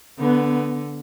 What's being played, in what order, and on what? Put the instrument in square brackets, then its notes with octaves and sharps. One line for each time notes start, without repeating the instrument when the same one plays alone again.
[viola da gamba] D3 [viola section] B3